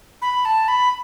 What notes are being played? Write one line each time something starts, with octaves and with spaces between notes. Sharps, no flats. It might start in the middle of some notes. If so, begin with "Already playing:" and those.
B5
A5
B5